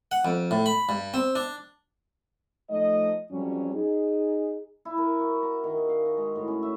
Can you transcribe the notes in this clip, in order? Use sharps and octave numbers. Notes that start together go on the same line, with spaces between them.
F#5
F2
A2
B5
G2
C4
D4
F3 A3 D#4 D#5
F2 F#3 G3 C#4
D#4 G#4
E4
A#4
F#4
A#5
D#3
G#4
F5
F#4
G#3
A2
C#4
E5